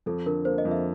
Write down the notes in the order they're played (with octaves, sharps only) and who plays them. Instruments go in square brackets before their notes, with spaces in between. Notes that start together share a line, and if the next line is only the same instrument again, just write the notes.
[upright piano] F2 [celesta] A4
[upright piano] D3 [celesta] A#4
[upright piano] A#3 [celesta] C5
[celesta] D#5
[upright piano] F2
[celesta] E5